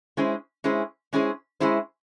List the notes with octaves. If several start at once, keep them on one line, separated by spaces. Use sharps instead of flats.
G#3 C#4 E4 G#4 C5
G#3 C#4 E4 G#4 C5
G#3 C#4 E4 G#4 C5
G#3 C#4 E4 G#4 C5